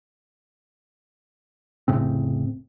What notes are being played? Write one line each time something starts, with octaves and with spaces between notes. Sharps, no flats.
F1 A2 C#3 C4